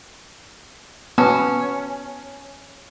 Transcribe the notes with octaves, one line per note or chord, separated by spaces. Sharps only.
B3 C#4 A5